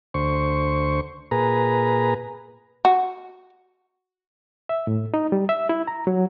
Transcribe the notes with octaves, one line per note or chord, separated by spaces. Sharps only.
D2 C5 C#6
A#2 G#4 B4 A#5
F#4
E5
A2
D#4
G3
E5
E4
A#5
F#3